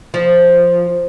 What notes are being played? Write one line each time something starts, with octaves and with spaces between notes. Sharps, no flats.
F3